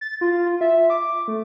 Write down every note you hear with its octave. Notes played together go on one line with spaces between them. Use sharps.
A6
F4
F4
E5
D6
A3